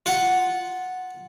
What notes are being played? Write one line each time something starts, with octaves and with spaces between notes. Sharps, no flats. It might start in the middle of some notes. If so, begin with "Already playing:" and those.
F4 F#5